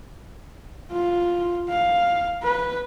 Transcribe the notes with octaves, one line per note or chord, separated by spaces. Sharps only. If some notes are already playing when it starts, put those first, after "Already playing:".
F4
F5
B4